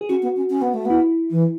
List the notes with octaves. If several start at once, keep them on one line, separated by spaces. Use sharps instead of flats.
G#4
C#4 F#4
B3
C#4
C#4
B3
A3
B3 E4
E3